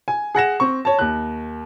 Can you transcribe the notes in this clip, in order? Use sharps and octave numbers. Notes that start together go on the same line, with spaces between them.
G#5
G#4 F#5 A#6 E7
C4 C#6
C#5 A5
D#2 F#6